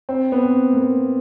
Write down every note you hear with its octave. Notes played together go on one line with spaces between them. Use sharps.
C4
B3
C4
A#3
B3